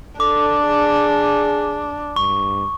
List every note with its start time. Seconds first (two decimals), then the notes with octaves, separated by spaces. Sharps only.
0.20 D4 A4 D6
0.65 G#4
2.16 G2 C#6